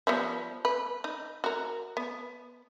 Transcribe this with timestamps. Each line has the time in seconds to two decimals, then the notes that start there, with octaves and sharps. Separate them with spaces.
0.07 F3 G3 B3
0.65 B4
1.04 D#4
1.44 F#4 A#4
1.97 B3